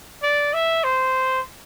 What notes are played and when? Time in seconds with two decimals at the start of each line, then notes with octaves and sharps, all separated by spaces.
0.23 D5
0.53 E5
0.84 C5